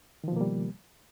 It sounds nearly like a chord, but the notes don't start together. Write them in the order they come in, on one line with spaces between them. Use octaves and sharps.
D#3 F3 B2 A#3 G3